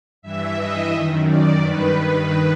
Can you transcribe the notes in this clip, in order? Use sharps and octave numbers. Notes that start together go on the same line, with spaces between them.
G2 E3 E5
D#5
F#2 D#3
D5
G2 D#3 B4
B4